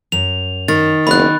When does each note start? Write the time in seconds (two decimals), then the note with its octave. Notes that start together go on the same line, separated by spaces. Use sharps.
0.12 F#2 F7
0.68 D#3 A6
1.07 F#1 B3 B5 F#6